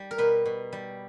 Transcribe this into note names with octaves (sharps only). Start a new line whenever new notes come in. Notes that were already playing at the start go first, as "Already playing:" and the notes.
Already playing: G3
A#4
B2 B4
B2
G3